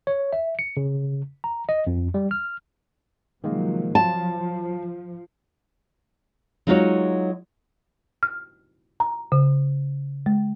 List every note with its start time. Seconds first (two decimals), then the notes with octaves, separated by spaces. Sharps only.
0.07 C#5
0.33 E5
0.59 C#7
0.77 C#3
1.44 A#5
1.69 D#5
1.87 F2
2.14 G3
2.31 F6
3.44 C3 D#3 F3 F#3 G#3 A#3
3.95 F3 F#3 F4 A5
6.67 F#3 G#3 D#4 F4 F#4 C#5
8.23 F6
9.00 A#5
9.32 C#3
10.26 G#3